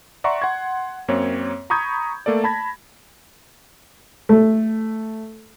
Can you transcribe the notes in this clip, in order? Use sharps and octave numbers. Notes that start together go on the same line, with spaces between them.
D5 E5 F#5 A#5 C6 C#6
F#5 C6 G#6
F#2 A#3 C4 C#5
A#5 B5 C#6 D#6 G6 G#6
A3 A#3 A4 D5
A5 B5 G#6 A#6
A3